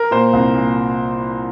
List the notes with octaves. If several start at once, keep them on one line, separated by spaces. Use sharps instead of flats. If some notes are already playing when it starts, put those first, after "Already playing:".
Already playing: A#4
A#2 C5
C2
A#2